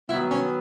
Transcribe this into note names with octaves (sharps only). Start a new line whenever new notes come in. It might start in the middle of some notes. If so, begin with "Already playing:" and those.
D#3 F#3 B3 E4
C#4